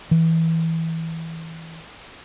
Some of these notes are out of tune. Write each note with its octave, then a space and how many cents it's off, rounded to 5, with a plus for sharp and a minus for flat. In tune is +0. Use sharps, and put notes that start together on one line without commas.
E3 -15